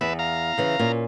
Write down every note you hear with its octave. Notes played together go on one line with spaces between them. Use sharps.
E2 B4 E5
F5 A#5
C#3 E3
A#2 C#4